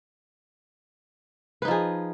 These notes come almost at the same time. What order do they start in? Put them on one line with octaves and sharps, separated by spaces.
B4 D#4 F3 G#4